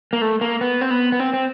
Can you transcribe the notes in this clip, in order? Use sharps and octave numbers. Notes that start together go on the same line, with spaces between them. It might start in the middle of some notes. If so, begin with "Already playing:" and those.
A#3
A3
A#3
B3
C4
B3
B3
C4
C4